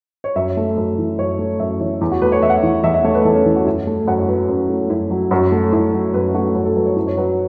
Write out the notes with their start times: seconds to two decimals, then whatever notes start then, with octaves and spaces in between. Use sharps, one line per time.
0.24 C#5
0.36 F#2 E5
0.57 A3
0.77 F#2
0.98 E3
1.19 F#2 C#5
1.39 A3
1.60 F#2 E5
1.80 E3 C#5
2.01 E2
2.11 F#4
2.22 A3 B4
2.32 C#5
2.42 E2 E5
2.50 F#5
2.57 E5
2.63 E3
2.84 E2 E5
2.94 E5
3.04 A3 C#5
3.15 B4
3.25 E2 A4
3.35 C#4
3.46 E3 E4
3.56 F#4
3.66 F#2 E4
3.87 A3
4.07 F#2 F#5
4.18 C#5
4.28 F#3 B4
4.49 F#2 C#4
4.69 A3
4.90 F#2 E4
5.11 F#3
5.31 F#2 F#4
5.52 A3
5.73 F#2 E4
5.93 F#3
6.14 F#2 B4
6.34 A3 F#4
6.55 F#2 F#4
6.65 A4
6.76 F#3 B4
6.86 C#5
6.96 F#2 E4
7.07 C#5
7.17 F#3 B4